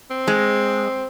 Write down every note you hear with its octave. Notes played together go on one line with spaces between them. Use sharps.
C4
G#3